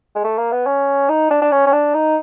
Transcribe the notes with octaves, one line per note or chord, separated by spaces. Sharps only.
G#3
A3
A#3
B3
C#4
D#4
D4
D4
C#4
C#4
D4
D#4